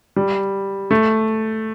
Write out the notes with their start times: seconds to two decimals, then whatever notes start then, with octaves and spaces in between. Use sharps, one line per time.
0.16 G3
0.91 A3